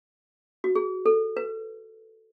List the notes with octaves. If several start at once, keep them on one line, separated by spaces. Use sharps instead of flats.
F#4
G#4
A4
B4